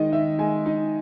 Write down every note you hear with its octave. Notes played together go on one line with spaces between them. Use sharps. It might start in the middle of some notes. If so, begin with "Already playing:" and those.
Already playing: D#3 G#3 D#4 D#5
D#3 E5
G#3 G#5
D#4